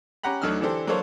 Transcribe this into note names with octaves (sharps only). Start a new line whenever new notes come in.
C#4 G4 F#5 A#5 B5
D2 D3 F#3 D#4 E6 F6
D3 E3 D4 G4 A4 C5
F#3 A#3 D4 A4 C5 C#5